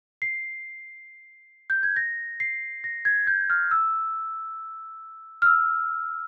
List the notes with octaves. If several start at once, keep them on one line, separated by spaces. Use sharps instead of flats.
C7
G6
G#6
A#6
C7
A#6
G#6
G6
F6
E6
F6
E6